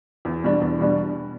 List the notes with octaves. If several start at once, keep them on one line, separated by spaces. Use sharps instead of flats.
E2
B2 G3 D4
E2
B2 G3 D4